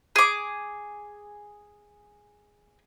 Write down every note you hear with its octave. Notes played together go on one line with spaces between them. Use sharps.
G#4 D6